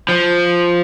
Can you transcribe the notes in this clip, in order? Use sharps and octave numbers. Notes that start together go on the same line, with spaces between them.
F3